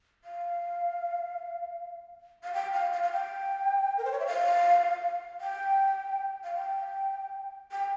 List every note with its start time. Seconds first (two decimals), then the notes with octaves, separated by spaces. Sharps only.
0.24 F5
2.44 F5
2.54 G5
2.73 F5
2.93 F5
3.03 F5
3.12 G5
3.98 A#4
4.05 C5
4.12 C#5
4.19 E5
4.26 F5
5.41 G5
6.44 F5
6.55 G5
7.71 G5